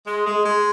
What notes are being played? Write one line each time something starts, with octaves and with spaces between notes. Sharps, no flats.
G#3
G#3
G#3